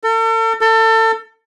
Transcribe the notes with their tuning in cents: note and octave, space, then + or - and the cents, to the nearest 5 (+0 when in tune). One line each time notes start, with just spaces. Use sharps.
A4 +40
A4 +30